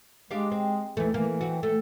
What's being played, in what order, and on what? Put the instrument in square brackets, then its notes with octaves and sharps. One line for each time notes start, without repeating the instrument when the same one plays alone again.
[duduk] G#3 [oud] D4 G4 F5
[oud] C4
[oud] D#2 A3 [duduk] E3
[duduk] E3 [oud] A#3
[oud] C4 F#4
[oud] A3 [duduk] A4